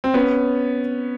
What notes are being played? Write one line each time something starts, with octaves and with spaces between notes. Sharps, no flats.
C4
B3 C#4